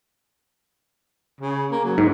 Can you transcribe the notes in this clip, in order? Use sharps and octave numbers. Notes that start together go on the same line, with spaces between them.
C#3
A#3
F#3
G#2